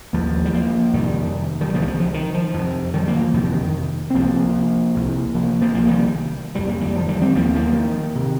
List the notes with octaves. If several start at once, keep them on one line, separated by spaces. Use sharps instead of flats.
D#2 F3 A#3
G3
F3 A#3
F2 C3 D#3 G3
D#3 G3
C2 C3 F3 A#3
G3
F3
F3
D#3
F3
F2 C3
D#3 G3
F3 A#3
F3
F2 C3 D#3
F3
D#3
C4
C2 C3 F3 A#3
C2 C3
F3 A#3
F3 A#3
C2 C3 F3 A#3
D#3 G3
F2 C3 G3
A#3
D#3 G3
F3
D#3 G3
G3 C4
D#2 F3 A#3
F3 A#3
F3
D#3
C3